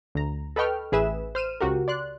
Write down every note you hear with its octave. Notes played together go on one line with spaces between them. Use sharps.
D2 A#5
A4 B4 D#5 G5 C#6 F6
A1 G#4 B4 E5 E7
C5 F6 D#7 E7
C#2 F#4 G4 A#4
D5 C6 F#6